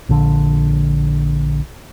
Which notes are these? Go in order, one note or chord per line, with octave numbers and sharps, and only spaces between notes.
A#1 D3